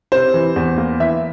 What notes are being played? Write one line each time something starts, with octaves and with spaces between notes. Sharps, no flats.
C3 C5
E3
E2
A#3
E3 E5